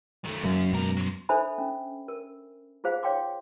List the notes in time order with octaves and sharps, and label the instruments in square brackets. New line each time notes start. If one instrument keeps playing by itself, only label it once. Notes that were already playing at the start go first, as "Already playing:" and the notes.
[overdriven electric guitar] D#3 A3
[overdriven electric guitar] F#2 [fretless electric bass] C#3 F#3 A#3
[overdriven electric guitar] C#2 A#4 [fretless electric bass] F#2 B2
[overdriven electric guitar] F#3 C6
[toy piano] D4 A4 C5 E5 G#5 B5
C#4
A#4
F4 G#4 C5 F5 F#5
C#5 F5 G5 C6 D6